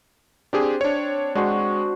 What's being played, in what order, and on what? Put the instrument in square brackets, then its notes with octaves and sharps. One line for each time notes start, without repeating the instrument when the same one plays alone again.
[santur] C4 [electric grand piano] D4 G4 G#4
[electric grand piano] D4 C#5
[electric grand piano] G#3 [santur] D4 F#4 C5